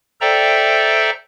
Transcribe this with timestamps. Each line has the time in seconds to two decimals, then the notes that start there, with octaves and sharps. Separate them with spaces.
0.21 A4 C5 D5 E5 G5 A#5